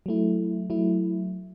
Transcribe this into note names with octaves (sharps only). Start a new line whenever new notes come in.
F#3 A3 E4
F#3 A3 E4